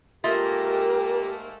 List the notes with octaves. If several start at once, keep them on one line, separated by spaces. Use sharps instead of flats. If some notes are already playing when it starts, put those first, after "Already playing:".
G#2 A3 A#3 F4 G4 A#4 D#5 E5